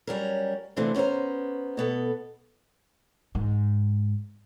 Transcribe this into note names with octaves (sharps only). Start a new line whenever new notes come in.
F#3 G3 C#4 A#4
C3 E3 A3 A#3 C4 D4
B3 C#4 B4 C5 A#5
B2 B3 A4
G#2